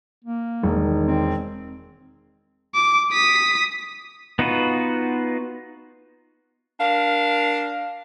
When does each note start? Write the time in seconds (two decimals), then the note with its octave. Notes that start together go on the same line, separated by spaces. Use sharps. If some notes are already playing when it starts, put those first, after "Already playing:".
0.24 A#3
0.63 E1 D#3
1.07 C4
2.74 D6
3.12 D#6 B6
4.39 B3 D#4 F4 F#4 B4
6.80 D4 A#4 F5